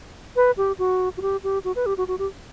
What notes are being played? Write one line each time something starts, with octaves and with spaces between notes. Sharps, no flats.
B4
G4
F#4
F#4
G4
G4
F#4
B4
G4
F#4
F#4
G4